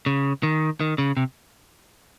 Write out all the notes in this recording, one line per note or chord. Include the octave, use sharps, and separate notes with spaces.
C#3
D#3
D#3
C#3
C3